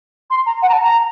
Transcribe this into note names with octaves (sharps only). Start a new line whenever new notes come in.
C6
A#5
F#5
A#5
A5
A#5